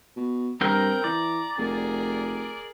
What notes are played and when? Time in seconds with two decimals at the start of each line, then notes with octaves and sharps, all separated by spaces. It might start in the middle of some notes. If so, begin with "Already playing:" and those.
0.16 B2
0.61 G2 C4 A#4 G5 A#5
1.04 E3 D5
1.58 F1 G#4 A#4